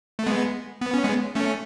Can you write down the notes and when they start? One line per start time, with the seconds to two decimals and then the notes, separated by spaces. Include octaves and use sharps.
0.19 A3
0.26 G#3 B3
0.81 B3
0.94 C#4
1.04 G#3 B3
1.35 A3 C#4